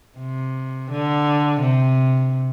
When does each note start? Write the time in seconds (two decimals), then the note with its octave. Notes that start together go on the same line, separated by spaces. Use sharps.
0.18 C3
0.90 D3
1.60 C3